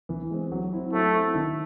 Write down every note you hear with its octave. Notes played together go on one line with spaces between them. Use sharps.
E3
G#3 C4
F#3
C4 E4
F#3 A3
C4 E4
D#3